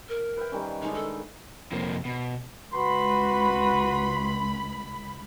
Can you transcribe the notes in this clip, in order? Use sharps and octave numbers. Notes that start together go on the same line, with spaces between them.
A#4
B4 E5 G5
D#3 G3 C#4
D#3 G#3 D4 D#4
A4
F2 C3 A#3
B2
C#2 F#4 B4 B5 C6